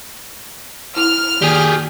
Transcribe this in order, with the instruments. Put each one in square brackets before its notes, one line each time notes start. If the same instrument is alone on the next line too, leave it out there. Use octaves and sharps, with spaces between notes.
[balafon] E4 [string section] F6
[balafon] D#3 A#3 [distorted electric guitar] G4 G#4